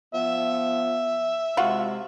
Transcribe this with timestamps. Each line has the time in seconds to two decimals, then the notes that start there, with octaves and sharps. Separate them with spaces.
0.14 F3 B3 E5
1.57 C3 G#3 F4 F#4